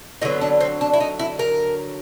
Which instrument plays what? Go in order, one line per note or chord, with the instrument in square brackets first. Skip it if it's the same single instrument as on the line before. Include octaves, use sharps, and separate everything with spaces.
[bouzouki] D3 F#3 B3 D#4
D4
C4
D4
E4
D#4
E4
A#4